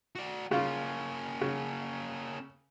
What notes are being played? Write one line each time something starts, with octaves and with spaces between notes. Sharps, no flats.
F#4 D5
C#3 A#3 C#4 F4
C#3